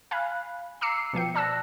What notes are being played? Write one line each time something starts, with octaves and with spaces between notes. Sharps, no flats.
F5 G#5 B5 F#6
A#5 D6 E6 C7 C#7
B2 F3 G5 C#7
D5 A5 E6 F#6 A#6